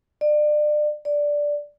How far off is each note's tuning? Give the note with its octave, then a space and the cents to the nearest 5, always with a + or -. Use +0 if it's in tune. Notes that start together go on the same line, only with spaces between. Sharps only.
D5 +30
D5 -5